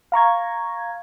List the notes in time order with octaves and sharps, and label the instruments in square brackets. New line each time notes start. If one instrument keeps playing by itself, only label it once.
[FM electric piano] F5 A#5 C#6 G#6